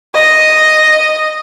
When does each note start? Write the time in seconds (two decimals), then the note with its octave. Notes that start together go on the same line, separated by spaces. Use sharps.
0.14 D#5